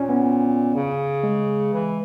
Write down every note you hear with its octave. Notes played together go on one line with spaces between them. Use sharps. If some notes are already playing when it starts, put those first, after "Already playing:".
Already playing: A#2 C#4
B3
C#3
G#3
E3